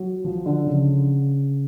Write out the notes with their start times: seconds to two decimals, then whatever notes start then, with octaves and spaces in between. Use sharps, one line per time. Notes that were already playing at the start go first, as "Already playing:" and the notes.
Already playing: F#3
0.24 F3
0.46 D3
0.67 C#3